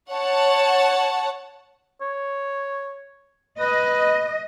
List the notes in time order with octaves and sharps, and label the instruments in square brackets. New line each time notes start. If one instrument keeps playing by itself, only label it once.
[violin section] C#5 F#5 A5
[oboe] C#5
[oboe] B4 [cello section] D#5